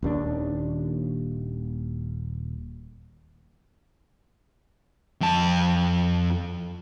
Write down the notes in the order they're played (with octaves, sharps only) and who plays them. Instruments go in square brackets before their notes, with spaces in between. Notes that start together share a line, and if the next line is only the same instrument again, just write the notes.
[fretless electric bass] D#1 D#2 D4
[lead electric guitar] F2 A5